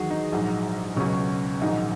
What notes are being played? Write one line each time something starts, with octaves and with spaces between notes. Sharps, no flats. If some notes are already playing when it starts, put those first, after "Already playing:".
Already playing: E2 D#3 F#3 F#4 G#4
D#4
A#1 G#2 F#3
C#2 B2 F#3 C#4
A#1 G#2 D#3 F#3 D#4